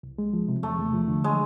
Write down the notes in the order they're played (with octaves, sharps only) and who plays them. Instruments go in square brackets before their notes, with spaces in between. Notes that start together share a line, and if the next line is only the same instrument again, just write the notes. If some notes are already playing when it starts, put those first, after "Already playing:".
[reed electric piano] C2
G#3
F3
C3
[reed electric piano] E2 [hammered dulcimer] A3
[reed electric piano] E2
F3
D3
[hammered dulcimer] G#3